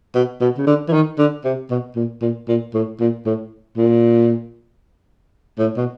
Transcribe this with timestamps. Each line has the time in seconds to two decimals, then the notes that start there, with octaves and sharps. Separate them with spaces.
0.15 B2
0.41 B2
0.57 C#3
0.67 D3
0.88 E3
0.93 D#3
1.18 D3
1.44 C3
1.70 B2
1.96 A#2
2.22 A#2
2.48 A#2
2.74 A2
3.00 A#2
3.26 A2
3.77 A#2
5.58 A2
5.77 B2